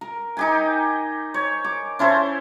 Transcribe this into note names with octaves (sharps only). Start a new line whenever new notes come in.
A#4
D#4 G4 G#5
C#5
D6
C#4 E4 A4 C5